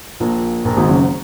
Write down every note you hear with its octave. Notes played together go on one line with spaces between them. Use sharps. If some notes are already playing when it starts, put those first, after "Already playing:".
A#1 A#2
A#1 A#2
G#1 G#2
F#1 F#2